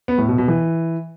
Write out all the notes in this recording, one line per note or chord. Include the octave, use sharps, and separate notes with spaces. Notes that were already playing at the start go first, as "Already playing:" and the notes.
B3
A2
B2
B2
E3